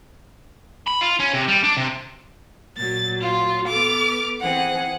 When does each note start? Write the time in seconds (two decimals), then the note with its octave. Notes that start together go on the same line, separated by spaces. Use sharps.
0.88 B5
1.02 F4
1.20 C#4
1.34 C3
1.48 G3
1.64 D4
1.77 C3
2.77 A#2 F#3 A6
3.22 F4
3.67 B3 A4 D6 F6
4.41 E3 C4 G#4 F#5